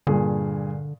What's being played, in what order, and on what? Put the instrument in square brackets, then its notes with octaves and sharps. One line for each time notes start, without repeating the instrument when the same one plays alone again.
[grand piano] G2 A#2 G#4 [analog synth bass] D3